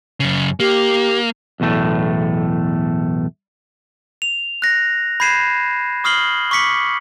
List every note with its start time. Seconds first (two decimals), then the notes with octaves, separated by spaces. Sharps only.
0.20 F#2 C#3
0.60 A#3 G4
1.60 B1 E2 A2 A3
4.22 F7
4.62 F#6 A#6
5.20 B5 G6 G#6 C7 D#7 E7
6.04 C#6 D#6 F6 C7 F#7 G7
6.51 C#6 D6 B6 C#7 F#7